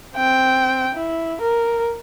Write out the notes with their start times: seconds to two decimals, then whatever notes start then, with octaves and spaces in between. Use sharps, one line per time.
0.16 C4 G5
0.95 E4
1.41 A#4